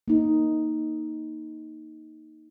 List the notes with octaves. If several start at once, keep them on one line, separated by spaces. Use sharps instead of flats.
A#3 D#4